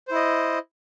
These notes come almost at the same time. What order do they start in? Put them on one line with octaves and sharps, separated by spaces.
C5 E4 D#5